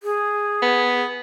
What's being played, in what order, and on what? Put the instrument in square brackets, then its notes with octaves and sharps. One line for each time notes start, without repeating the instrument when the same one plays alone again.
[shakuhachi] G#4
[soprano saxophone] B3